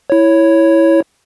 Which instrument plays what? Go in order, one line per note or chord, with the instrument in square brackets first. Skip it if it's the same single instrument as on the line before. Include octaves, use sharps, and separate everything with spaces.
[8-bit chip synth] E4 C#5